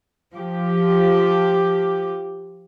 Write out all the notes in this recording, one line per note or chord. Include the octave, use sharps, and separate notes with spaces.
F3 G4